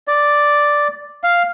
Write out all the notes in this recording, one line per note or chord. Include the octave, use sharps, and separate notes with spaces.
D5
F5